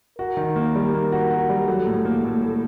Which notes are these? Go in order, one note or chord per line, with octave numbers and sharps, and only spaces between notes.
F#4 A#4
D#3
A#3
G3
A#3
F#4
F#4
G3
F#3 A4
A2
A#3
A2
A2